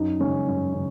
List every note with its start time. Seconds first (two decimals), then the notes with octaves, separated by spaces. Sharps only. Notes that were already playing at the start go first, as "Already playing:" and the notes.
Already playing: F#2 D#4
0.20 C#3 G#3 C#4
0.47 F#2
0.74 C#3